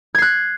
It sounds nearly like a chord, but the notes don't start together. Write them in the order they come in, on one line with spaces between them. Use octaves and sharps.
G#6 C7 F#6